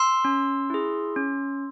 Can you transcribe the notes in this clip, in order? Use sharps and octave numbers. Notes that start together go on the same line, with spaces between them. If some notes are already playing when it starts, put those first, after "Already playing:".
Already playing: C6 E6
C#4
E4 G#4
C#4